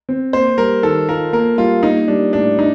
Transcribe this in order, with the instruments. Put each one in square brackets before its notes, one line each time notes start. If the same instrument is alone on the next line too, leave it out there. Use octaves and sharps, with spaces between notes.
[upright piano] C4
[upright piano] A#3 [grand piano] C5
[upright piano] G3 [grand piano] A#4
[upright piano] D#3 [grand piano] A4
[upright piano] F4 [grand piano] A#4
[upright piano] A#3 [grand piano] A#4
[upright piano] G3 [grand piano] F4
[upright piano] A#3 [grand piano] D#4
[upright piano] G3 [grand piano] D4
[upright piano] A2 [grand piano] D4
[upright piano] D4 [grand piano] D#4